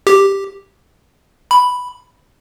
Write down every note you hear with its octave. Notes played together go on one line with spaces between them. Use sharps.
G4
B5